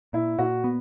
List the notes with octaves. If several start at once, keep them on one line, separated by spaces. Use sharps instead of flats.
A#2 E4
A#2 F#4
B3